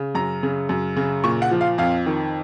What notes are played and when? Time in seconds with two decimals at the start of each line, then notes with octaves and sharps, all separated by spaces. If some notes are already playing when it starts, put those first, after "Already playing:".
Already playing: C#3
0.15 F#2 A#5
0.43 C#3
0.69 F#2
0.96 C#3
1.24 A#2 C#6
1.42 F#5
1.51 F3
1.61 F5
1.78 F2 F5
2.06 D#3